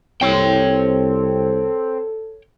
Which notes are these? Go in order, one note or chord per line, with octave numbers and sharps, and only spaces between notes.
C2 C4 A4 C#5 G5